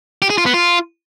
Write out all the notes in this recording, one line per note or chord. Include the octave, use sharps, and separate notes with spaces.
G4
G#4
F4
B3
F4